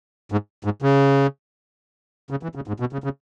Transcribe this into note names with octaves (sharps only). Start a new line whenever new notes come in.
G#2
G#2
C#3
C#3
E3
C#3
G#2
B2
C#3
C#3